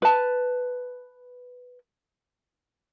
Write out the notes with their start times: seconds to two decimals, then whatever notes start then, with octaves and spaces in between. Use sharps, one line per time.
0.02 B4 A5